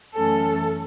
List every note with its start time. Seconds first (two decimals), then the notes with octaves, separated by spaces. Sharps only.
0.13 F#2 E3 A3 C#4 A4